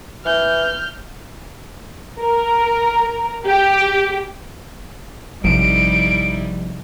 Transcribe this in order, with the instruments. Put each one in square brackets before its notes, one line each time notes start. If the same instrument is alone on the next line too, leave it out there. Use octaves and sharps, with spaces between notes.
[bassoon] E3 [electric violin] F6 G6
[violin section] A#4
G4
[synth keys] A1 F3 [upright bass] C3 [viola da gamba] G3 D#4 E4 [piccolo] D7